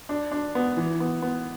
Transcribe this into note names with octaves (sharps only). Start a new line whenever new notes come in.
D4
D4
B3
E3
B3
B3